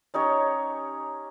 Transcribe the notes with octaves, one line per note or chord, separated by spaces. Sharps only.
C#4 D#4 G4 C#5